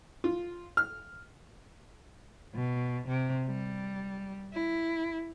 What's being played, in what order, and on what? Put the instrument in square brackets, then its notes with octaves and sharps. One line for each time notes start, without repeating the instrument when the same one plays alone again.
[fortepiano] F4
F6
[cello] B2
C3
G3
E4